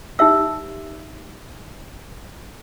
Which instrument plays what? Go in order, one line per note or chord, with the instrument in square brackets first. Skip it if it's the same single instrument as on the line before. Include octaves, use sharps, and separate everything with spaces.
[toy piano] D#4 G4 E5 E6